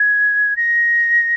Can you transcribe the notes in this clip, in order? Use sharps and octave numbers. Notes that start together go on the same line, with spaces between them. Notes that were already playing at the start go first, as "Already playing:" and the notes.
Already playing: G#6
A#6